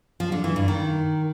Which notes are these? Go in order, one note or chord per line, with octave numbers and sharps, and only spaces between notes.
F3
D3
E3
G2
D#3